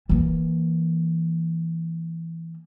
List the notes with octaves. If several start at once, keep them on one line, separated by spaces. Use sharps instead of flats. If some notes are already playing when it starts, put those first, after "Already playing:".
E3 A#3